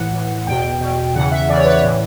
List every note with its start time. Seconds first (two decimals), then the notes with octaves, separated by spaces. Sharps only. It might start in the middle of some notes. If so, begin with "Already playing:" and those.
Already playing: A2 E3 F#5
0.13 A2 E3
0.47 E2 B2 G5
0.81 E2 B2
1.15 E2 C#3 E3 F#5
1.32 E5
1.49 E2 C#3 E3 D5
1.57 C#5
1.65 B4
1.73 C#5
1.82 A2 E3